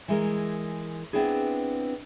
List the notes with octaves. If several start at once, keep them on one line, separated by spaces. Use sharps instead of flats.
E3 G#3 A#4
B3 C4 D4 E4 G#4